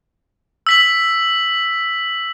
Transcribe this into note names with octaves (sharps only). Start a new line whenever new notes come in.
E6 B6 F#7